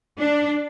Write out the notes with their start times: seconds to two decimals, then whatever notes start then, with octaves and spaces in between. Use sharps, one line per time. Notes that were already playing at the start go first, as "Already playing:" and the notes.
0.19 D4